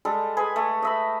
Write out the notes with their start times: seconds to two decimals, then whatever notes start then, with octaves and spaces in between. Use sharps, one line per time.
0.05 G3 G#3 A4
0.37 G#4 B4 G#5
0.56 A3
0.82 D#5 E5 B5